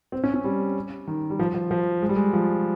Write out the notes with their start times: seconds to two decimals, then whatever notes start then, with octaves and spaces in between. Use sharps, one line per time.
0.12 C4
0.24 C#4
0.34 C#4
0.44 G3
1.07 D#3
1.30 G3
1.39 F3
1.54 F3
1.71 F3
2.02 G#3
2.09 G3
2.16 G#3
2.33 F3